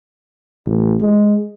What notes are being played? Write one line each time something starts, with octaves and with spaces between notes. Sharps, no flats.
A1
G#3